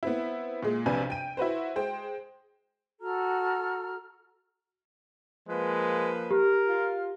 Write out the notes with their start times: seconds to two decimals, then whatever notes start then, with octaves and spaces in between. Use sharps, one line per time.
0.03 B3 C4 E4
0.62 A#2 G#3
0.86 B1 C3 F3 D4 B4 G#5
1.10 G5 D#7
1.37 E4 F#4 B4 C5
1.76 G#3 C5 G5
3.01 F#4 A4 A#5 F6
5.49 F3 G#3 A#3 B4
6.31 G4 A#4
6.68 F4